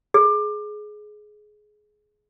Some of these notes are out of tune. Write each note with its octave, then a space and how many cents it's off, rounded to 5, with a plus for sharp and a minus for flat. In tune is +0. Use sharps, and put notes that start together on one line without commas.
G#4 +20